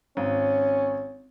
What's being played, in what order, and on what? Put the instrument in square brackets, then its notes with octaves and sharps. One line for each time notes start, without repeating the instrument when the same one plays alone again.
[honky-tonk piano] G#1 [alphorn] C#4